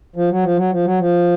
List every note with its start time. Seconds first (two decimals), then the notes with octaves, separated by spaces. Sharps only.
0.16 F3
0.31 F#3
0.44 F3
0.57 F#3
0.72 F3
0.85 F#3
0.99 F3